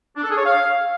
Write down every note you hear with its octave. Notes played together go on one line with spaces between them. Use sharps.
D4
A4
G#4
C#5
F5